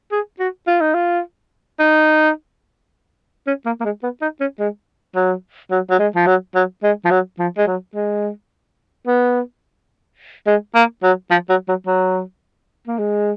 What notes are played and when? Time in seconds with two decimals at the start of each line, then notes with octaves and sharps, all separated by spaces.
0.12 G#4
0.39 F#4
0.67 F4
0.81 D#4
0.94 F4
1.79 D#4
3.47 C#4
3.66 A#3
3.80 A#3
3.85 G#3
4.03 B3
4.22 D#4
4.40 C#4
4.59 G#3
5.15 F#3
5.71 F#3
5.90 F#3
5.99 G#3
6.15 F3
6.26 F#3
6.55 F#3
6.83 G#3
7.05 F3
7.11 F#3
7.39 F3
7.57 G#3
7.67 F#3
7.95 G#3
9.07 B3
10.47 G#3
10.75 A#3
11.03 F#3
11.31 F3
11.49 F#3
11.68 F#3
11.87 F#3
12.88 A#3
12.98 G#3